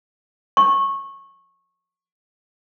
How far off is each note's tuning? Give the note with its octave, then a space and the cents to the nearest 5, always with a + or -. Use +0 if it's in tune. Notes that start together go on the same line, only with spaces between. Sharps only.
C#6 -20